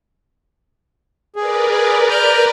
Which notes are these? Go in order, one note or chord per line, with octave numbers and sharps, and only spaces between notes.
G#4 A#4 B4 D5
G#4
A#5 F6 G6